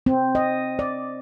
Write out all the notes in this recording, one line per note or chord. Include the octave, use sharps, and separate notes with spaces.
C4
D#5
D5